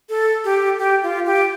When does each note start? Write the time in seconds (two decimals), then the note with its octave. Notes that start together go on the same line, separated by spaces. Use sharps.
0.09 A4
0.45 G4
0.79 G4
1.03 F4
1.26 G4